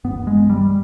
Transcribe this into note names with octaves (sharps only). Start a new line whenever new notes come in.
G2 B3
G#3
G3